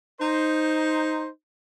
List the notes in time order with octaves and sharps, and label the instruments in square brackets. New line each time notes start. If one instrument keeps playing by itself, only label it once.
[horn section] D#4 C5